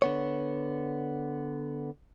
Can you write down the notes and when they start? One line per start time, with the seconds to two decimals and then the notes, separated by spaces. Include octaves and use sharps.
0.02 D3 B3 C#5